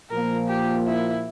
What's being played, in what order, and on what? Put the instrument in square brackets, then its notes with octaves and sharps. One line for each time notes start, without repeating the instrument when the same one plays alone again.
[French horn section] A#2 F3 A#3 F4 [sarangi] A#4
[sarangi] G4
E4